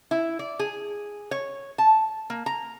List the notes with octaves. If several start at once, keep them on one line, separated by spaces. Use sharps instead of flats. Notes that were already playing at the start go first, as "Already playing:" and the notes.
E4
D5
G#4
C#5
A5
A#3
A#5